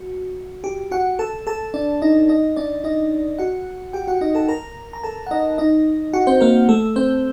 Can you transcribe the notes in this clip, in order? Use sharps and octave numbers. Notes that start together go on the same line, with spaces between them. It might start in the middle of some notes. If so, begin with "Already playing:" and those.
Already playing: F#4
G4
F#4 F#5
A4 A5
A4 A5
D4 D5
D#4 D#5
D#4 D#5
D4 D5
D#4 D#5
F#4 F#5
G4 G5
F#4 F#5
D#4 D#5
A4 A5
A#4 A#5
A#5
A4 A5
F#5
D#4 D#5
D#4 D#5
F#4 F#5
C4 C5
A#3 A#4
A3 A4
C4 C5